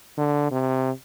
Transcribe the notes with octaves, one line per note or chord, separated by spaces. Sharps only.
D3
C3